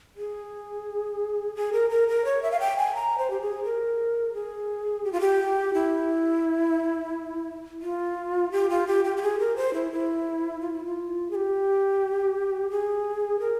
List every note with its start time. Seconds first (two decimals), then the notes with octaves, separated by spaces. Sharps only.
0.16 G#4
1.55 G#4
1.73 A#4
1.90 A#4
2.08 A#4
2.25 C#5
2.42 E5
2.51 F5
2.60 G5
2.77 G#5
2.95 A#5
3.18 C5
3.30 G4
3.41 G#4
3.64 A#4
4.34 G#4
5.04 G4
5.12 F4
5.21 G4
5.74 E4
7.82 F4
8.52 G4
8.70 F4
8.87 G4
9.04 G4
9.17 G4
9.22 G#4
9.39 A#4
9.56 C5
9.74 E4
9.92 E4
10.61 F4
10.73 E4
10.85 F4
11.31 G#4
11.35 G4
12.70 G#4
13.40 A#4